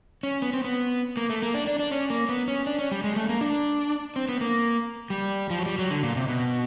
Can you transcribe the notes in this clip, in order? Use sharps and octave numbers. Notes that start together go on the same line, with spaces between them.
C#4
B3
C4
B3
A#3
A3
A#3
D4
D4
D4
C#4
A#3
B3
C#4
D4
C#4
G3
G#3
A3
A#3
D4
C4
B3
A#3
G3
F3
F#3
G3
F#3
D3
A#2
C3
B2